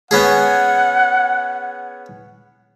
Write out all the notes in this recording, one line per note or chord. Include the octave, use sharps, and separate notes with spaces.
B3 C#4 G#4 F#5